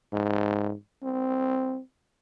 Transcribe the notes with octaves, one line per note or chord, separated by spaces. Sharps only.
G#2
C4